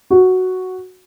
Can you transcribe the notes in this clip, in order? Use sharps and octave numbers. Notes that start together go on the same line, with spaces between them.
F#4